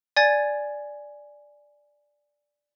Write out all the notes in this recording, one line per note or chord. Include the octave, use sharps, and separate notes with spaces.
D5 G#5 G#6 A6